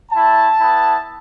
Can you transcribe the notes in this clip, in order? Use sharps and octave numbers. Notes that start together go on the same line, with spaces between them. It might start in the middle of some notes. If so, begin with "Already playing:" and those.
A3 E4 A5
B3 E4